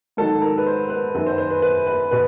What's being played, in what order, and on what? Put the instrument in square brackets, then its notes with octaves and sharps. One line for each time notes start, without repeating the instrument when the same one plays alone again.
[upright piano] G#2 D#3 F#3 A4
A#4
B4
C5
B4
F#2 D#3 F#3 B4
C5
C5
B4
B4
B4
B2 B4